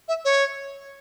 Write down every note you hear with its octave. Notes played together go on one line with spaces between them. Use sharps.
E5
C#5